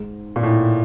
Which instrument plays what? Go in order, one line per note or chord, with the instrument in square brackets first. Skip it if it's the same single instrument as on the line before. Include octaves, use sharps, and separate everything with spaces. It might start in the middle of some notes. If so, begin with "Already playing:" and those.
Already playing: [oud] G#2
[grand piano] A#2
A2